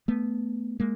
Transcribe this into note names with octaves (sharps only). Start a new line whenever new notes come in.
A3 B3
G#3 A#3